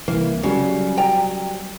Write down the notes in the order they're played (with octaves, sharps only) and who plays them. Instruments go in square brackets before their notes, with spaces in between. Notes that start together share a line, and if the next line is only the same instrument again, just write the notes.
[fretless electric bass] C2 E3 [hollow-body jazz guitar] A#3
[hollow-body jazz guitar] C#3 [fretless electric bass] F#3 G3
[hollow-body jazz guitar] G5 A#5